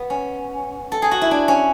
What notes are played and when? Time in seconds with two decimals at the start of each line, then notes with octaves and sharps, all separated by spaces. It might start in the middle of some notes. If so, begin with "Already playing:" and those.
Already playing: B3
0.10 C#4
0.92 A4
1.02 G#4
1.11 F#4
1.21 E4
1.31 D4
1.48 C#4